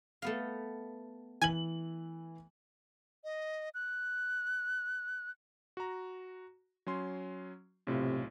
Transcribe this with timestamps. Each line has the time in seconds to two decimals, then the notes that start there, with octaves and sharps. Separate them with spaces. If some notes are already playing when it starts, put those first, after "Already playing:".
0.22 A3 B3 F5
1.42 E3 G#5 G#6 F#7
3.24 D#5
3.74 F#6
5.77 F#4 A#5
6.87 F#3 C#4 C6
7.87 B1 A2 C3 F4